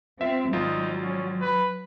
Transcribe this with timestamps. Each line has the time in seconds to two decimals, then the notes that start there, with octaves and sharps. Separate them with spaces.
0.21 C4 F4 E5
0.53 G#1 F#3 D#4 F4
1.03 C#4
1.41 B4